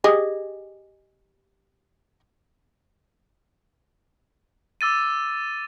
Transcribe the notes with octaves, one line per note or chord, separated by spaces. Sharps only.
G4 G#4 D#5
D6 E6 A6 D#7